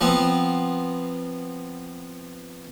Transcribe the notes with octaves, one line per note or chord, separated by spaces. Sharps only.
F3 B3 C4